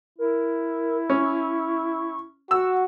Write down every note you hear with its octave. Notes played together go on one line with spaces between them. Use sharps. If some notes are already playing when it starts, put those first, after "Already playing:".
E4 A#4
C#4 C#6
F#4 F#5 E6